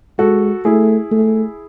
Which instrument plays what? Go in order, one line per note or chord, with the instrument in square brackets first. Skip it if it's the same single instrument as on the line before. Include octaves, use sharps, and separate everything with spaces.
[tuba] G#3 [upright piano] F#4 A4
[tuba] A3 [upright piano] E4 G#4
[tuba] A3